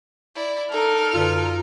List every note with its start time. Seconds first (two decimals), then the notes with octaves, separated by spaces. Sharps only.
0.35 E4 D5
0.72 D#4 A4 A#4 F6
1.14 F#2 D3 F4 B4